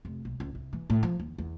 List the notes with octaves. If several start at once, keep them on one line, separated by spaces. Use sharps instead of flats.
F1
B1
C#2
C2
E3
A2
F3
D#2
E2